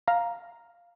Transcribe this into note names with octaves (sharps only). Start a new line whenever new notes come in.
F5 A#5